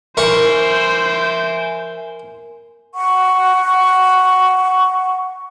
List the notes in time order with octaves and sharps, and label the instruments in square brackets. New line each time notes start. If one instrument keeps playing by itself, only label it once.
[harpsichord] A#4 C#6 [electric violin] C5 [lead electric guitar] E5 G#5
[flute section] F#5 C#6